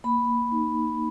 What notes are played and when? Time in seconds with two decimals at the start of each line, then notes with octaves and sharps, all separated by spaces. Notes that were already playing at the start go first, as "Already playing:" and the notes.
0.04 A#3 B5
0.51 D#4